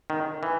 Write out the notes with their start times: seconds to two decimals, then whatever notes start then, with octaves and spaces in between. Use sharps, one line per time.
0.10 D#3
0.43 E3